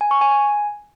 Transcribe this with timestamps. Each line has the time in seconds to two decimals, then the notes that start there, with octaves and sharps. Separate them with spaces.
0.01 G#5
0.11 C#6
0.21 G#5
0.31 G#5